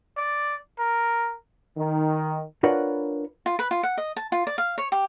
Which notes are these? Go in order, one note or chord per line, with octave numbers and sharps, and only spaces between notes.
D5
A#4
D#3
D4 F4 A#4 B4 C#5 F#5
F4
B4
F4
F#5
D#5
A5
F4
D5
F5
C#5
G4